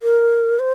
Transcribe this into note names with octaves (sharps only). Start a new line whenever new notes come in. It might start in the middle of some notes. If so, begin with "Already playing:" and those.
A#4
C5